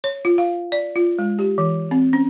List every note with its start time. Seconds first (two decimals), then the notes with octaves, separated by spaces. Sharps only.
0.04 C#5
0.25 F4
0.38 F5
0.72 D5
0.96 F4
1.19 G#3
1.39 G4
1.58 E3
1.91 C4
2.13 C#4